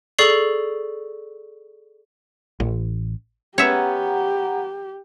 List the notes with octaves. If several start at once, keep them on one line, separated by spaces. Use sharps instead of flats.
G#4 A4 D5 C#6 C7 F#7
A1
B3 C#4 G4 C#5 E5 F#5 A#5